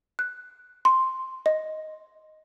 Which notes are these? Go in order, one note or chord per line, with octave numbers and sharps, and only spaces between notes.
F#6
C6
D#5